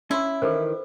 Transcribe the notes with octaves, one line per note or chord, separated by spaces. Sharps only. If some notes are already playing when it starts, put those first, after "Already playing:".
C#4 E4 C6
D#3 E3 A4 B4 C5